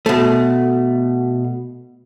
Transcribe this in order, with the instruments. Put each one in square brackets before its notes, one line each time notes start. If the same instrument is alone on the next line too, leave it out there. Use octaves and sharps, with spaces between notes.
[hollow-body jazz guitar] B2 A3